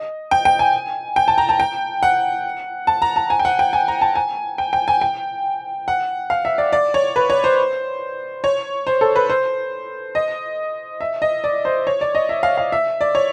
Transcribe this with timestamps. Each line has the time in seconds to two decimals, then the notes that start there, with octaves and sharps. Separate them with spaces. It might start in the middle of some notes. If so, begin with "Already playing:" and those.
Already playing: D#5
0.31 G5
0.45 G5
0.59 G#5
1.16 G5
1.28 A5
1.38 A#5
1.49 A5
1.60 G5
2.03 F#5
2.87 A5
3.02 A#5
3.16 A5
3.30 G#5
3.39 G5
3.45 F#5
3.59 G5
3.73 G#5
3.88 A#5
4.01 A5
4.15 G#5
4.58 G5
4.73 G5
4.88 G#5
5.01 G5
5.88 F#5
6.30 F5
6.45 E5
6.58 D5
6.73 D5
6.94 C#5
7.16 B4
7.30 C#5
7.44 C5
8.44 C#5
8.87 C5
9.01 A4
9.16 B4
9.29 C5
10.15 D#5
11.01 E5
11.22 D#5
11.44 D5
11.65 C5
11.87 C#5
12.01 D5
12.15 D#5
12.29 E5
12.43 F5
12.57 F5
12.72 E5
13.01 D5
13.15 C#5